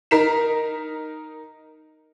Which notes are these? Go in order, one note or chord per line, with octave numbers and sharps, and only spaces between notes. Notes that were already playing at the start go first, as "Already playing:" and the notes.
D#4 A#4 A#5 B6 C7 E7